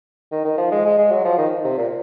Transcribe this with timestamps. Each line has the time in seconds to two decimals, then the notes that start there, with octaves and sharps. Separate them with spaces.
0.32 D#3
0.45 D#3
0.57 F3
0.72 G#3
0.85 G#3
0.98 G#3
1.11 F#3
1.25 F3
1.38 D#3
1.64 C3
1.78 A#2